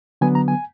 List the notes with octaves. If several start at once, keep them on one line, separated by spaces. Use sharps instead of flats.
D3 F#3 B3 G#5
A#5
G#5